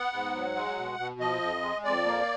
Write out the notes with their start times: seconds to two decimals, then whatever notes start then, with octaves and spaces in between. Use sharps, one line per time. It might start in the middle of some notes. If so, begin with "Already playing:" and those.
Already playing: B3 F#5
0.13 G#2
0.34 F#3
0.56 G#3
0.78 B2
0.98 B2
1.20 F3 D#5
1.42 F2
1.62 G#3
1.85 F2 D5
2.06 A#3